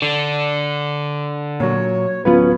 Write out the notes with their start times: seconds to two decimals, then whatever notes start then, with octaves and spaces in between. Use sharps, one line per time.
0.02 D3 D4
1.60 A#2 F#3 C#5
2.25 D1 F#3 B3 C#4 F4 B4